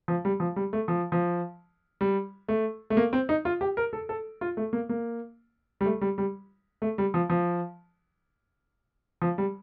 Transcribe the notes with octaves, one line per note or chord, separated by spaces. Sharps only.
F3
G3
F3
G3
A3
F3
F3
G3
A3
A3
A#3
C4
D#4
F4
G4
A#4
A4
A4
F4
A3
A#3
A#3
G3
A3
G3
G3
A3
G3
F3
F3
F3
G3